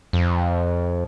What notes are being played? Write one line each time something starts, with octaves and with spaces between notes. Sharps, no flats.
F2